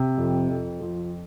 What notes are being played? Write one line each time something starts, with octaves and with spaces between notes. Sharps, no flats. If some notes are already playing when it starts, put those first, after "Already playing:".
Already playing: C3
F2
F2
F3